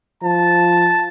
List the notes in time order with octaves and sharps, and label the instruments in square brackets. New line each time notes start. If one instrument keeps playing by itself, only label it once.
[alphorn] F3 [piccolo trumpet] A5